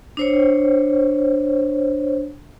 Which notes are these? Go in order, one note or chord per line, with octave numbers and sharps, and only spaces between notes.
D4 C5 C#5